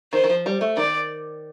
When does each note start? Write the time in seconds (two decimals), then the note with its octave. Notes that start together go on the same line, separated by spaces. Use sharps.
0.13 D#3 C5
0.24 D#3
0.29 F3
0.46 G3
0.61 A3
0.77 D#3 D5